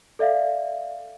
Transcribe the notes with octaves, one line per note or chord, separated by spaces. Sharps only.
A4 D5 E5 F5